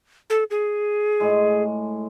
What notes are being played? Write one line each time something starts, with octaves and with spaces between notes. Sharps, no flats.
A4
G#4
A2 G#3